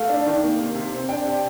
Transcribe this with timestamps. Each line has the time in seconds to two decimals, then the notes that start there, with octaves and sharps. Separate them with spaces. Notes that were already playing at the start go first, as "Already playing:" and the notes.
Already playing: A3 F5
0.09 D4
0.26 D#3
0.43 A#3
0.59 C3
0.75 C3
0.92 C4
1.09 D4 G5
1.25 C3